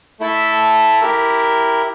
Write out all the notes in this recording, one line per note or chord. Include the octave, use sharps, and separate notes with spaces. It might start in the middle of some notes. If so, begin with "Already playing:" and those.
A3 E4 A4 E5
E4 G4 A#4